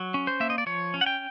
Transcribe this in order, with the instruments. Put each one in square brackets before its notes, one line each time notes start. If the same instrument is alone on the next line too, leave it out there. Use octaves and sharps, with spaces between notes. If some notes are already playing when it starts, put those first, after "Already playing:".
Already playing: [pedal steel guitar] F#3
C#4
C5
A#3 E5
D#5
D5
F3 C#5
C#4
F#5
G5